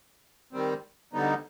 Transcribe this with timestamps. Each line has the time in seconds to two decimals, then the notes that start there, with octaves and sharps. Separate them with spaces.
0.53 D#3 G3 C4
1.13 D2 D3 G3 B3 D#4